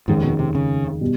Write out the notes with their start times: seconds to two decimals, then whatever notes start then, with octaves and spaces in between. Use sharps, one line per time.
0.08 F1 D#2 G#2 D#3 G#3 C#4
0.24 B2
0.39 C3
0.55 C#3
1.01 B2 G3